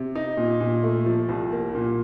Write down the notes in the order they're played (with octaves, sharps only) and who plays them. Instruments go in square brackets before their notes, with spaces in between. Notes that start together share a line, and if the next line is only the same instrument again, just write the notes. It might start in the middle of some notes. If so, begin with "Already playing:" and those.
Already playing: [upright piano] C3
D#4
A#2
A#2
A3
F3
C2
A#3
A#2